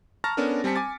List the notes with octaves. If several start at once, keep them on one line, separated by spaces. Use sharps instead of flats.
A5 A#5 C#6 F6 A6 A#6
B3 C#4 D4 A4 A#4
G3 C4 G#5 A5 B6 C#7
G#5 D6 A6